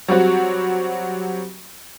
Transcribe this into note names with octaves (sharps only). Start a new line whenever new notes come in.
F#3 G3 C4 F#4